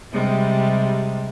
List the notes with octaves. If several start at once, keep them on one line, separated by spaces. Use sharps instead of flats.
C3 G3 G#3